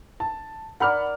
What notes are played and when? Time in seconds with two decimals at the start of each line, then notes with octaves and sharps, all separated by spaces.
0.20 A5
0.80 A#4 D5 F#5 B5 F6